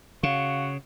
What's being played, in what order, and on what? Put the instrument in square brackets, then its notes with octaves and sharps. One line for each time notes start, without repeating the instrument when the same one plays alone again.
[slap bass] C#3 [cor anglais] F#4 [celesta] F5